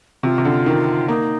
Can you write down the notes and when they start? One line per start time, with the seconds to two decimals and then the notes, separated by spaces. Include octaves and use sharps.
0.23 C3 F4
0.38 C3
0.45 D3
0.66 D#3
1.08 A#3 D#4